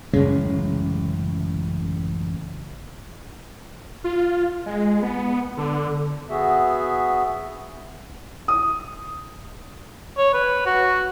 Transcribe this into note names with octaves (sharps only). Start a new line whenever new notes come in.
A1 F#2 C#3 G#3
F4
G#3
B3
D3
B3 F#4 G#4 E5
D#6
C#5
B4
F#4